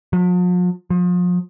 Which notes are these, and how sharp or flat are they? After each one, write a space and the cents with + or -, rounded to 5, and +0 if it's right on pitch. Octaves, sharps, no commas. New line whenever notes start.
F3 +45
F3 +35